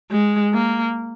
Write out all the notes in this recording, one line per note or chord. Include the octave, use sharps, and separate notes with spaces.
G#3
A#3